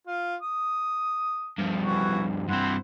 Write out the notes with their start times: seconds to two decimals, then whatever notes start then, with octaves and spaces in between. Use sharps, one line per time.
0.07 F4
0.42 D#6
1.59 G2 F3
1.82 E3 F#4
2.48 G2 C4 E4 C5 F#5